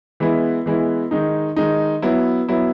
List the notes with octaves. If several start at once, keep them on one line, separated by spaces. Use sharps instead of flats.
E3 G#3 B3 E4
E3 G#3 B3 E4
D#3 G#3 D#4
D#3 G#3 D#4
F#3 B3 E4
F#3 B3 E4